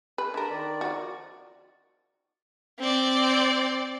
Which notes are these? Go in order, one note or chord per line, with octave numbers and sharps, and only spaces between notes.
B4
D3 A#4 A5 B5
D#3 D5
F3 F#4
C4 D5